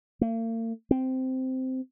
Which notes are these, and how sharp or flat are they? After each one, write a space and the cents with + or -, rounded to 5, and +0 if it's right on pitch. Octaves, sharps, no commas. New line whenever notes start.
A#3 -45
C4 -10